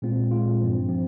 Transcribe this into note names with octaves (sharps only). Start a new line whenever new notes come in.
A#2 G#3 C4 F4
A#2 G#3 C4 F4
G2 F3 C4
F3 C4